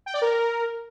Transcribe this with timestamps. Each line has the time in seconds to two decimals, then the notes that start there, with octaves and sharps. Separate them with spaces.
0.06 G5
0.14 D5
0.22 A#4